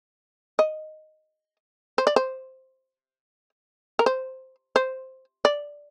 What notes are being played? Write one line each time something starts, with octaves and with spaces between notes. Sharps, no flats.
D#5
C5
D5
C5
A#4
C5
C5
D5